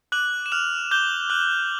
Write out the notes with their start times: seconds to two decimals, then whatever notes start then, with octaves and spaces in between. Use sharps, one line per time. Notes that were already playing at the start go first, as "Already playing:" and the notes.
0.12 D6 F#6 F#7
0.46 E7
0.52 F6 F#6 F7
0.91 D6 G6 G7
1.30 F#6 F#7